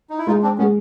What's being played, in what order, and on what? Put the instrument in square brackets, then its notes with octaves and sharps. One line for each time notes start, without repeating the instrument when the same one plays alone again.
[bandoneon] D#4
E4
[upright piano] G#3 [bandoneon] D#4 F4
[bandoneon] C4 D4
[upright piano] G#3 [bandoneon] B3 C#4